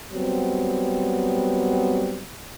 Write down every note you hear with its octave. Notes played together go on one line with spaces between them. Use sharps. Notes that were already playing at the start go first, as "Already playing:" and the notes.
F#3 G3 B3 C4